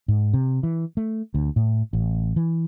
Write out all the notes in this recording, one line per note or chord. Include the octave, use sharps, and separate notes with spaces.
G#2
C3
E3
A3
D2
A2
A1
E3